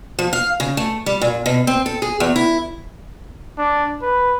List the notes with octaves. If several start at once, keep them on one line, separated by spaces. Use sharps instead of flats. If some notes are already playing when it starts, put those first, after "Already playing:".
F3
F5
C#3
A3
G3
A#2
B2
C4
A4
G#4
E2
E4
D4
B4